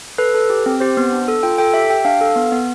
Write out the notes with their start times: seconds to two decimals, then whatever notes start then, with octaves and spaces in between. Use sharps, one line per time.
0.18 A4 B4
0.34 A4
0.50 G4
0.66 C4
0.80 G4 C5
0.97 B3
1.12 D4
1.28 A4
1.43 F4 G5
1.58 A4 G5
1.74 G4 E5
1.90 G4 G5
2.05 D4 F5
2.21 A4
2.36 B3
2.52 B3